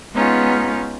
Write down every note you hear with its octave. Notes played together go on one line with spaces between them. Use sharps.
G#3 B3 C#4 D#4 F4